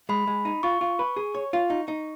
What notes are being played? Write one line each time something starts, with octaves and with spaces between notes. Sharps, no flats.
G#3 B5
G#3
D#4
F4 C#6
F4
B4
G#4
C#5
F4
D#4
D#4